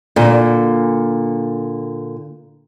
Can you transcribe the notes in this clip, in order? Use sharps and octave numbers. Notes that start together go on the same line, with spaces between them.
A#2 D3